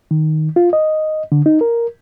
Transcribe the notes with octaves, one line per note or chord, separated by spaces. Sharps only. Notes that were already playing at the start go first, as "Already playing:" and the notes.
D#3
F4
D#5
D3
D#4
A#4